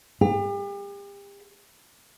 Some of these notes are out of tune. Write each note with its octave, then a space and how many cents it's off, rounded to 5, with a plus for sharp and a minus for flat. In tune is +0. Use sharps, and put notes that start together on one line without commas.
G4 +40